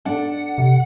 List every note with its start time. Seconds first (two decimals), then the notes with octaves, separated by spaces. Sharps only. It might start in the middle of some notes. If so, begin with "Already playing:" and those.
0.06 D4 A4 F#5
0.58 C3